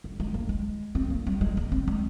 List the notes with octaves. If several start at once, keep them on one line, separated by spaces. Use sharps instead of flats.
G3
G#3
A#3
G#3
C4
A#3
G3
G#3
A#3
C4
G#3